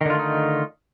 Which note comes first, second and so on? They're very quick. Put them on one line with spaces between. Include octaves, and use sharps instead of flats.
D#3 D3 F4 A3 D#4